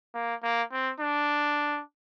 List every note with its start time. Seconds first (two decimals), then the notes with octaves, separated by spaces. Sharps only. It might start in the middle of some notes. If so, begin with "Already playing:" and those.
0.15 A#3
0.43 A#3
0.72 C4
1.01 D4